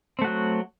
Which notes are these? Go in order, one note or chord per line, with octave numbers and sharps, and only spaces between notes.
F#3 A3 C4 F#4